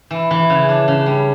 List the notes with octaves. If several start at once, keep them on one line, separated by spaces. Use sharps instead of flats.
E3
E3
C#3
D4
C#3
G3